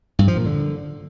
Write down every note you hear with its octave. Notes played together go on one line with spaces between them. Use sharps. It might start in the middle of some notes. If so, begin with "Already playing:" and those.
G2
F3
A#2
D3